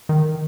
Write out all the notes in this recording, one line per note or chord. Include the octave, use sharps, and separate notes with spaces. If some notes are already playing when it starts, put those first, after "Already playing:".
D#3